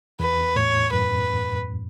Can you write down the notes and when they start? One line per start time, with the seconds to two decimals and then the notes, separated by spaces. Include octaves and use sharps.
0.20 E2 B4
0.56 A2 C#5
0.92 F#2 B4